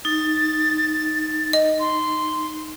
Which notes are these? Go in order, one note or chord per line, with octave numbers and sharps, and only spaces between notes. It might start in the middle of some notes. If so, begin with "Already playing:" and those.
D#4 A6
D#5
C6